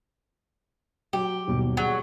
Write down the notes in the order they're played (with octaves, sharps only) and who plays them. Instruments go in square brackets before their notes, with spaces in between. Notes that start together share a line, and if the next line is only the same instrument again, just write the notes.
[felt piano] F#3 [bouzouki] G4
[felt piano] D#1 B2
[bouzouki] F#3 [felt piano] G#4 D5